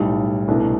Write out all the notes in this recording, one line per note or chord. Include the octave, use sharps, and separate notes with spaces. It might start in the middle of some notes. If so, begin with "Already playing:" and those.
Already playing: B1 A2 G3
C2 B2 A3 D4